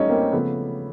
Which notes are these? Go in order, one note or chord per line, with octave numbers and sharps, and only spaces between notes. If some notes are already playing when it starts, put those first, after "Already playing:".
Already playing: G3 A3 C#4 D#4
A#3 C4
C#3 F3 A3 B3